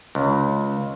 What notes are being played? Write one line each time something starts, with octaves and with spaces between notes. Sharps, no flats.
C#2